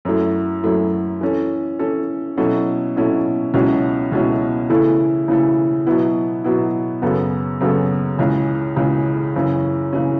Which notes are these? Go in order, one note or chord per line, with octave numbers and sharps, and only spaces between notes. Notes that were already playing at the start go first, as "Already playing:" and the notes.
F#2 F#3 A3 E4
F#2 F#3 A3 E4
E3 C#4 A4
E3 C#4 A4
B2 F#3 C#4 E4 A4
B2 F#3 C#4 E4 A4
C#2 B2 F#3 C#4 E4
C#2 B2 F#3 C#4 E4
C#3 E3 A3 E4 A4
C#3 E3 A3 E4 A4
B2 F#3 B3 E4
B2 F#3 B3 E4
F#2 C#3 F#3 B3 A4
F#2 C#3 F#3 B3 A4
C#2 C#3 E3
C#2 C#3 E3
F#2 C#3 E3 C#4
C#3 E3 C#4